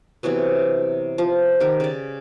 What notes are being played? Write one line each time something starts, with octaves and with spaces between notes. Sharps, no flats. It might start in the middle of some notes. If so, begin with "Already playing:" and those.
C3 E3 F#3 B3
F3
D#3 G4
C#3 D5